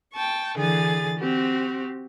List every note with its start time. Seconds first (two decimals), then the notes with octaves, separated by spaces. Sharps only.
0.14 G5 A5 C#6
0.56 D3 E3 G#4 G#5 A6
1.18 C4 F#4 G4